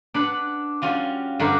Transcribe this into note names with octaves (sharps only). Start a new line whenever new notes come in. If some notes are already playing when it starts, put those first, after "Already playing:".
D4 B4 F#5
G3 C#4 F4 F#4
G2 D3 D4 F#4 A#4 B4